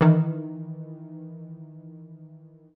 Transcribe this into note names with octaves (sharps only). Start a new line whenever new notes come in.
D#3 E3